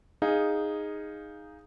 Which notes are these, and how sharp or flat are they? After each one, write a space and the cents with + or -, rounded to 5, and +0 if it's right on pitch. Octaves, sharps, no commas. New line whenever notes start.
D#4 +0 G#4 -10 F5 +0